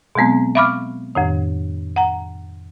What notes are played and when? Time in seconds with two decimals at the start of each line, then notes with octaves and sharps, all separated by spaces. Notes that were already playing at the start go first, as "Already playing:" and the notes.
0.15 B2 F#3 G#3 B3 C4
0.55 E5 F5 B5 C#6 D6 F6
1.15 F2 A2 D#3
1.96 F#5 A#5